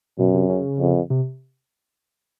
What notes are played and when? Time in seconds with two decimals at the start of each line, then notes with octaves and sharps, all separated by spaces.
0.19 F#2 B2
0.34 C3
0.49 C#3
0.80 F2
1.10 C3